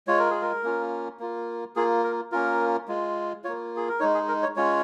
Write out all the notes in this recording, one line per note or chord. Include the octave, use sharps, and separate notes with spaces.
G#3 F4 C#5
A#4
G#4
A#4
A#3 C#4 F4
A#3 F4
A#3 F4 G#4
A#4
A#3 C#4 F4 A#4
G#3 F4
A#3 F4 C#5
G#4
A#4
G#3 D#4 C#5
G#4
A#4
C#5
G#3 C#4 F4 C#5